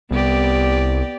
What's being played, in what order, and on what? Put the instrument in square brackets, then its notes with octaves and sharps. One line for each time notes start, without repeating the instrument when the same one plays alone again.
[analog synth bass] C2 [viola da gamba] B3 G4 D5